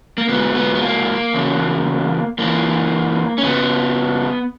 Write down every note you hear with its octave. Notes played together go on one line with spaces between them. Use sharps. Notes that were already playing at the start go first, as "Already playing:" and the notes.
A#3
G#2 F#3 B3
B3
B3
A#3
E2 C#3 F#3
F#2 E3 A#3
C#4
F#2 C#3 F#3 B3